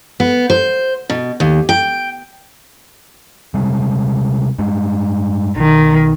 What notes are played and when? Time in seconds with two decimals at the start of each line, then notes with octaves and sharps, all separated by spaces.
0.20 B3
0.50 C5
1.10 B2
1.40 D#2
1.69 G5
3.54 C3 G3 G#3
4.59 G2 G#3
5.56 B1 D#3